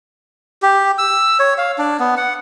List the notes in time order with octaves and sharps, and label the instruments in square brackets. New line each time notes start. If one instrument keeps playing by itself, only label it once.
[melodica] G4
E6
C#5
F5
D4
B3
F#5